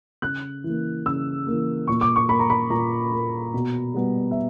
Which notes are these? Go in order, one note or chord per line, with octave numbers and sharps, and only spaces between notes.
C#3 F#6
E3 A#3
C#3 E6
E3 A#3
A#2 C#6
D6
C#6
A#3 B5
A#5
B5
A#2 A#5
A#3
B2
G3 B3
E5